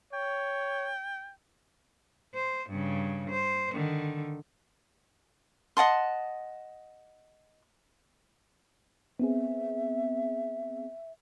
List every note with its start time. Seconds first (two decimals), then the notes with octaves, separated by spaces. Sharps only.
0.13 C#5 G5
2.34 C5
2.70 G2 C#3
3.30 C5
3.74 D3 D#3
5.77 D#5 F#5 A5 C6
9.19 B3 C4 G#4 E5